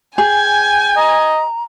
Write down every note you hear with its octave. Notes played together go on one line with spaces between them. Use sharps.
G#4 G5 G#5 G#6
D#5 A#5